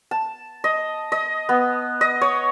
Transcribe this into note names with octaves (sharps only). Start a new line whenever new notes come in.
A5
D#5
D#5
B3
D#5
C#5